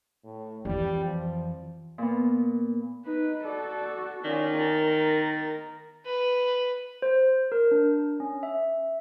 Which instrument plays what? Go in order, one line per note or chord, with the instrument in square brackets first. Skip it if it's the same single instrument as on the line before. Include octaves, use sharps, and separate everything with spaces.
[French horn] A2
[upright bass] F2 E3 [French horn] G3
[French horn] F3
[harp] A#2 B3
[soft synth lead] D#4 [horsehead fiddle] B4
[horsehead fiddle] F#4 A4 [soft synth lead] D5
[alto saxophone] D#3 [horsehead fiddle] C#4 F4 [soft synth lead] D5
[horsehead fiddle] A#4 [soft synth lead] A6
[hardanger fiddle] B4
[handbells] C5
A#4
D4
C#4
E5